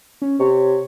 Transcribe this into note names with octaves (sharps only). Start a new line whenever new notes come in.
C#4
C3 C#5